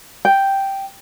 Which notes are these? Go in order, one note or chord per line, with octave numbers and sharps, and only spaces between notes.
G5